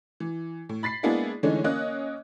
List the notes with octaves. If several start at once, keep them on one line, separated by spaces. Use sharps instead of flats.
E3
A2
B5 A6 B6 C7
G#3 A#3 B3 D4 E4 G#4
D3 E3 G#3 A3 C#4 D#4
A#3 C#4 D#5 F#6